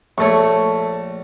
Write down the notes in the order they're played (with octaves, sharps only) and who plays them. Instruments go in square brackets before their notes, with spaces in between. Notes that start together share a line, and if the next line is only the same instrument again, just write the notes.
[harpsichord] A#1 C#5 [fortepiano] A3 C#6